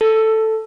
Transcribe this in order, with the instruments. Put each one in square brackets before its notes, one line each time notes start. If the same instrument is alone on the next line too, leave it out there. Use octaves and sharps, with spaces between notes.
[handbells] A4